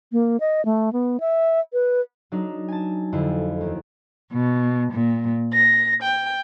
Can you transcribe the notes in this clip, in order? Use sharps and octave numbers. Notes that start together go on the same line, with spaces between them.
A#3
D#5
A3
B3
E5
B4
F#3 D4 D#4
G#5 A5
F2 D3 E4
D#2
B2
A#2
A#6
G5